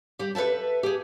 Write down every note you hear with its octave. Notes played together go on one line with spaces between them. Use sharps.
G3 G4
A4 B4 D5 E5 A5
G4 G#4